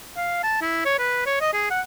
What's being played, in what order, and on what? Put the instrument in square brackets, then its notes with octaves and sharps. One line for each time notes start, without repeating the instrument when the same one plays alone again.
[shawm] F5
A5
E4
C#5
B4
C#5
D#5
G#4
F#5